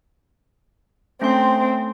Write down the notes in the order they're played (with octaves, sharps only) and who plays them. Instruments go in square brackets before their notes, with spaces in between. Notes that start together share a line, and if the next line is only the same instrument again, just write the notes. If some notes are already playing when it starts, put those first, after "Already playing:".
[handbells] A3 C#4 C6 [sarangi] C4